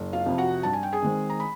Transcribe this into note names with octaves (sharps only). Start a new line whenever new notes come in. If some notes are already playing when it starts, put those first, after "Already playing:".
Already playing: F#1
F4 F5
F2 C3 F3
F#4 F#5
G2 A5
G#5
G5
G#4 G#5
D#3 G#3 C4
A#5
B5